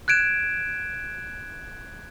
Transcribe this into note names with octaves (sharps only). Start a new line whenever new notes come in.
F#6 G#6 D7 E7